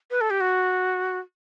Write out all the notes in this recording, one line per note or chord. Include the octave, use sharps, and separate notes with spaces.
B4
A4
G4
F#4